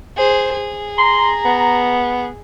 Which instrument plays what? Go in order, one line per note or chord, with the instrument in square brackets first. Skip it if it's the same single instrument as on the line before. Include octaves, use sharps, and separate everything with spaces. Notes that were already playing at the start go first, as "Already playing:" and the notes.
[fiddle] G#4 C5
G#4
[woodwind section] A#5 [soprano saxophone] C6
[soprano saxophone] B3